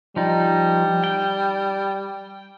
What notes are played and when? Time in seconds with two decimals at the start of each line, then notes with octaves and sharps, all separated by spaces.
0.16 F3 G3 D#4
1.04 G5